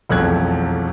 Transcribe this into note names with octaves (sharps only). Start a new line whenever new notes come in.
E1 B1 F2 A3 F#6 G#6